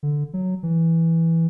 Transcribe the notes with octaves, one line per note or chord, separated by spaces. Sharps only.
D3
F#3
E3